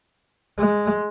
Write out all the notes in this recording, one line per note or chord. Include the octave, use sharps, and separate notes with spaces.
G#3